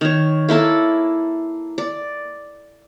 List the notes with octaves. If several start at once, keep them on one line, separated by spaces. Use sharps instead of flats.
D#3 C#5
A#3 E4 A4 A#4
D5